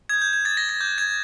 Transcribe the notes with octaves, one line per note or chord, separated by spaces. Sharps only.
D#6 G6 G#6
G6
G#6
D6 G6 A6
A#6
A6
D6 F#6 G6
G#6